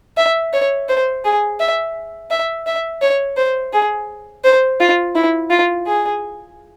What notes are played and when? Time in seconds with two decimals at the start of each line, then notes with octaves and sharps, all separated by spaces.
0.17 E5
0.53 C#5
0.89 C5
1.25 G#4
1.60 E5
2.31 E5
2.67 E5
3.02 C#5
3.37 C5
3.73 G#4
4.44 C5
4.80 F4
5.15 E4
5.50 F4
5.87 G#4